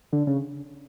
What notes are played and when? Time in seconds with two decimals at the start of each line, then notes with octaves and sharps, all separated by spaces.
0.13 D3
0.27 C#3